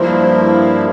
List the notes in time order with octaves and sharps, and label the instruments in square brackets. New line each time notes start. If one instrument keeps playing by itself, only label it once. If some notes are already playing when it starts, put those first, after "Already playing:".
Already playing: [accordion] G2 F3 A#3 E4 [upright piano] C5